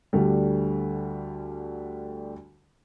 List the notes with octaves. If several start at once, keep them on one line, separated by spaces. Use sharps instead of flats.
D2 D3 G3